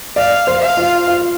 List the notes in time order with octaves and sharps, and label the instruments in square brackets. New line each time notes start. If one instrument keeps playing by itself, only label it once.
[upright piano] D5 [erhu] F5
[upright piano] C5
[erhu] F5
[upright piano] F4
F4